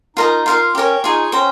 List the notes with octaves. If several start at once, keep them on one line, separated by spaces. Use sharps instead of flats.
D#4 F4 A#4 D#5 A#5
F4 A#4 F5 C6
C#4 G4 A#4 C#5
D#4 F4 G#4 C#5
C#4 C5 G5 A#5